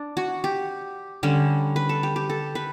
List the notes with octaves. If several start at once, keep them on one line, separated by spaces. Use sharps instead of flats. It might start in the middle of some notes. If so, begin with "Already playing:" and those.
Already playing: D4
F#4
G4
D3 G3 C#4
B4
A4
G4
G4
A4
B4